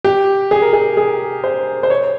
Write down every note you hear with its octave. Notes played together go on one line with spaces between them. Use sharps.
G4
G#4
A#4
G#4
G#4
C5
C5
C#5